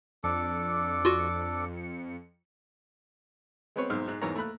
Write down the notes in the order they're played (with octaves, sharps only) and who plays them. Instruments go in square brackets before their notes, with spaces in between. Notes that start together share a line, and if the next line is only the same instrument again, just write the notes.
[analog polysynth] F2 C#7 [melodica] D4 A4 D6
[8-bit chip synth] F4 F#4
[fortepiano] G#3 B3 C4 B4 C#5
B1 G#2 C5 C6 E6 F6
G#2 F#6
E2 G#2 E3 A#4 C#5 A#5
A3 A#3 B5 F#6